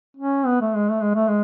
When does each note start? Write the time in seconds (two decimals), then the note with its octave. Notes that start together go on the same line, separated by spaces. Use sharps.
0.17 C#4
0.46 B3
0.61 A3
0.75 G#3
0.89 A3
1.01 G#3
1.15 A3
1.28 G#3